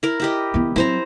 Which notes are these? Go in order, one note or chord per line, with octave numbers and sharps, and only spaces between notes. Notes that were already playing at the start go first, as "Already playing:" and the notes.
E4 A#4
E4 G4 D#5
E3 B3
F#3 C4 E4 C5 A#5